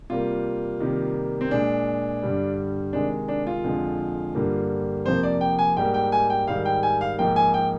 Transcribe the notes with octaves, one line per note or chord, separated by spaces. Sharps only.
C3 G3 A#3 F4
C3 D#3 G3 A#3
C4
A#2 G#3 D4
G2 D3 G3
C3 D#3 G#3 D4
D4
F4
F2 D3 G#3
G2 D3 G3 A#3
F2 C3 F3 A#3 C5
D5
G5
G#5
G#2 G3 A#3 G5
G5
G#5
G5
G#2 D#3 G3 F5
G5
G#5
F5
G#2 F3 A#3 G5
G#5
G5